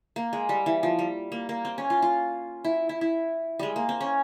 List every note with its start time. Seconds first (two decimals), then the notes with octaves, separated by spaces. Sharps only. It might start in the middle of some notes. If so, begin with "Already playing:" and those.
0.16 A#3
0.33 G#3
0.49 G3
0.66 E3
0.83 F3
0.99 G3
1.32 A#3
1.49 A#3
1.65 C4
1.78 C#4
1.90 F4
2.02 F4
2.64 E4
2.89 E4
3.01 E4
3.59 G3 G#3
3.76 A#3
3.89 C4
4.01 C#4